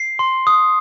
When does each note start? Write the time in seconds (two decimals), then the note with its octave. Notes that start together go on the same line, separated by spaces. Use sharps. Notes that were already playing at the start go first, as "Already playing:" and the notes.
Already playing: C7
0.19 C6
0.47 D#6